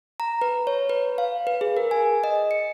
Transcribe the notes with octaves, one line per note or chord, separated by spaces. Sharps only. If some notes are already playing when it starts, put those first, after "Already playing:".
A#5
B4
C#5
B4
F5
B4
G#4
A#4
G#5
D#5
C#7